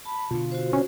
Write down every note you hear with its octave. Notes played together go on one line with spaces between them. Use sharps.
A5 B5
B2 D3 F4
F#4 C5
C#4